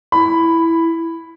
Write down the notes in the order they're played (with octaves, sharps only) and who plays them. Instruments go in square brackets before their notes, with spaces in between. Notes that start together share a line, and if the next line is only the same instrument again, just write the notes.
[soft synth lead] E4 [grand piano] B5